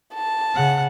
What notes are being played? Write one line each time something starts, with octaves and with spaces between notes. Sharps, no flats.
A5
C#3 F#5